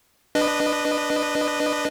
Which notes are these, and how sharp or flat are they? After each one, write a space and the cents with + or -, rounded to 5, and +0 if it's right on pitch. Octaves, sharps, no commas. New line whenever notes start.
D4 +0 B4 +0 D#5 -20